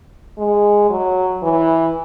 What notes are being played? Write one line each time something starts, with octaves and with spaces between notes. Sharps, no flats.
G#3
F#3
E3